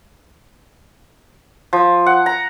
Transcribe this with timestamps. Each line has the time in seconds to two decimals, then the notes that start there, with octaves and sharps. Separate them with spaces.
1.73 F3
2.06 F#5
2.26 A#5